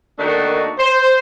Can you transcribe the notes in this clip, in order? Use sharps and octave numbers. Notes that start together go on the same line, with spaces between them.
D#3 A3 A#3 D4 D#4 F#4
C5